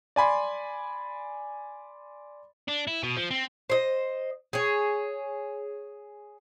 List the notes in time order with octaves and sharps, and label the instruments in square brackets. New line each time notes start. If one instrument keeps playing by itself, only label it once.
[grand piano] D5 G#5 B5 C6
[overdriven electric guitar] D4
E4
B2
F3
C4
[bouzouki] C5 D#5
G#4 C#5